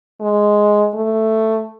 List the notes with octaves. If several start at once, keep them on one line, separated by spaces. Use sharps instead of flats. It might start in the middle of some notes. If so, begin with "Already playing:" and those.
G#3
A3